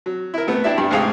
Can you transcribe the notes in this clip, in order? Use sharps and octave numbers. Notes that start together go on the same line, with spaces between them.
F#3
E4 A#4
G3 A3 B3
D4 E4 G4 D5 E5
G2 G3
C2 G#2 A3 G#4 F5 G5